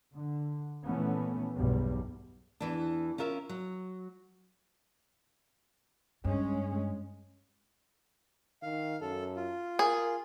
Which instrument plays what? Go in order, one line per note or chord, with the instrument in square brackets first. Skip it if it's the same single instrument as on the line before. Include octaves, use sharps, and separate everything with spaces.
[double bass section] D3
A#2 E3 A3 B3 C#4
B1 E2 G2 B2 G3
[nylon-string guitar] E2 E3 D4
C#4 F4 A#4 E5
F#3
[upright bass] G2 [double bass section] G#3 C#4
[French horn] D#3 [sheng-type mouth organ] F5
[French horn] F#2 [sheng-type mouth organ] A4
[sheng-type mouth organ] F4
[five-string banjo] G#4 [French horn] A#4